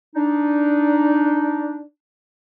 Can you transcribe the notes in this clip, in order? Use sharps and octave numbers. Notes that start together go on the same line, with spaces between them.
D4 D#4